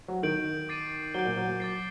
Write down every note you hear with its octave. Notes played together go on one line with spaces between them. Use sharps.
F#3
D#3 G6 D7 F#7
D6 A6 C7 D#7
F#3 G6 D7 G7
A#2
F#3
F#3
F#3 D6 A6 C7